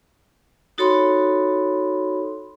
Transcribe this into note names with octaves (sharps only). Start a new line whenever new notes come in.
D#4 F#4 A4 C#5 B5 C6